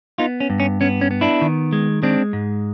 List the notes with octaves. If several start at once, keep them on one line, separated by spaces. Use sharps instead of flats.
B3 D#4 F4
C#4
G2
C#4
B3 C#4
C#4
B3
D4 E4
D#3
G#3
G#3 C4 D4
G#2